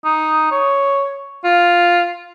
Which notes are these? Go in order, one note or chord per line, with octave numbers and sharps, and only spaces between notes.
D#4
C#5
F4